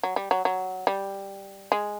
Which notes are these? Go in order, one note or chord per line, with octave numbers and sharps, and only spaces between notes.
F#3
G3
F#3
F#3
G3
G#3